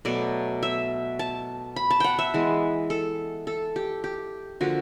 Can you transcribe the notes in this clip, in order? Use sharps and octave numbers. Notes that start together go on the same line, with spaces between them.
B2 F#3 A3 D5
E5
A5
B5
A5
F#5 G5
E5
E3 G#3 B3
A4
A4
G4
G4
D3 F3 A#3 F#4